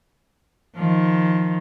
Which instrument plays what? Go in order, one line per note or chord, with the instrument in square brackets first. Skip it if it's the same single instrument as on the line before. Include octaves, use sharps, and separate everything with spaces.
[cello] D#3 F3